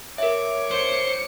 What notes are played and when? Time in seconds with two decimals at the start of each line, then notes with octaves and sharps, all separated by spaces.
0.18 A#4 C#5 E5 D6
0.71 C5 C#7